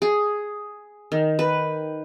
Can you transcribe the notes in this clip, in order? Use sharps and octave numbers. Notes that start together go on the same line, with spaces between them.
G#4
D#3
B4